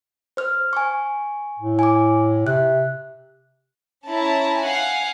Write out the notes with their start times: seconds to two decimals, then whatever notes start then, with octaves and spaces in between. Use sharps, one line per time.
0.37 C5 F6
0.73 G#5 C#6
1.59 A2
1.79 G#5 D6
2.47 C3 F#6
4.07 C#4 E4 A5 A#5
4.63 F5 F#5 G#5